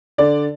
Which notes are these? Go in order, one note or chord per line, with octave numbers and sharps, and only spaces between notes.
D3 D5